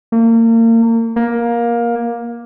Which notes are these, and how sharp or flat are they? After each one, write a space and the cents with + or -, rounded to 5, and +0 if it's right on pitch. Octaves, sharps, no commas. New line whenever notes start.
A#3 -35
A#3 +15